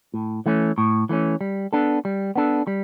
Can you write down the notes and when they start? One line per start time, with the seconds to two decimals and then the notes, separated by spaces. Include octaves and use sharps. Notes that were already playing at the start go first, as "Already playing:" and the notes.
0.14 A2
0.46 E3 A3 C#4
0.78 A2
1.09 E3 A3 C#4
1.41 G3
1.73 B3 D4 A4
2.05 G3
2.36 B3 D4 A4
2.67 G3